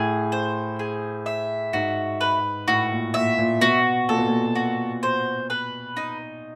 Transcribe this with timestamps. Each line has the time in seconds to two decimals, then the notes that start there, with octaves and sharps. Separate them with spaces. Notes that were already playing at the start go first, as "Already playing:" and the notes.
Already playing: A2 G#4
0.32 C5
0.79 G#4
1.26 E5
1.73 G#2 F#4
2.21 B4
2.67 A2 F#4
2.91 A#2
3.14 A#2 E5
3.38 A#2
3.61 B2 F#4
4.08 A#2 A4
4.18 B2
4.28 A#2
4.56 F#4
5.03 C5
5.50 B4
5.97 D#4